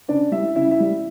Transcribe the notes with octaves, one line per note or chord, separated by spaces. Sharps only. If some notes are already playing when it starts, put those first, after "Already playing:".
C#3 D4 D5
G3 E4 E5
C#3 E4 E5
E4 E5
G3